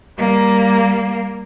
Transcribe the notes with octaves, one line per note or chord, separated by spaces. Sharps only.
G3 A#3